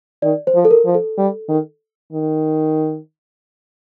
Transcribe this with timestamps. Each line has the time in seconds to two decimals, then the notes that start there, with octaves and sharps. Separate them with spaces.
0.22 D#3 D5
0.47 C5
0.55 F3
0.65 A4
0.71 A#4
0.86 F3
0.95 A4
1.18 G3
1.49 D#3
2.13 D#3